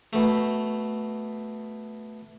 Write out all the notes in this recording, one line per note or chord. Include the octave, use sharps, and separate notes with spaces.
B2 A3